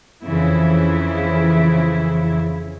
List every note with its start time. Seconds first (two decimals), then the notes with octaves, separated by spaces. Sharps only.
0.25 F2 C#3 E3 E4